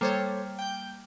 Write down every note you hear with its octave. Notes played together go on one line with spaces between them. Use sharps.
G3 A#3 A4 C5 C#5
G5 G6